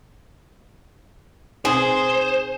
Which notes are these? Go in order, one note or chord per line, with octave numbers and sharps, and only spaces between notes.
B2 C4 D#4 G#4 C5